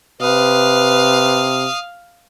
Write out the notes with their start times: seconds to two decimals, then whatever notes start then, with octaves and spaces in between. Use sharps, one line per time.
0.21 C3 B4 F5 D#6